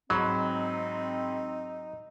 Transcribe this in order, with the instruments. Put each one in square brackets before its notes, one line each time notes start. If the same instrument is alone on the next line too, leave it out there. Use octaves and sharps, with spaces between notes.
[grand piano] G#2 B5 [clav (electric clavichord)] F#3 [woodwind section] C4 [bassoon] D#4